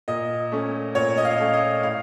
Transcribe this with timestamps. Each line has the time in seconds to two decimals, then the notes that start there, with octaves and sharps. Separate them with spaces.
0.08 A#2 D#5
0.52 A3 C#4
0.95 A#2 C#5
1.17 D#5
1.25 F5
1.40 A3 C#4
1.53 D#5
1.83 A2 F5